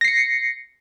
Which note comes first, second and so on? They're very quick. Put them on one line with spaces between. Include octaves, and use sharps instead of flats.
A#6 C7 C#7